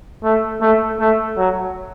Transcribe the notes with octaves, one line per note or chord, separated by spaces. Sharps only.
A3
A3
A3
F#3